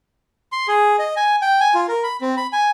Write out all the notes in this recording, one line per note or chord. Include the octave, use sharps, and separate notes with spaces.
C6
G#4
D#5
G#5
G5
G#5
F4
A#4
B5
C4
B5
G#5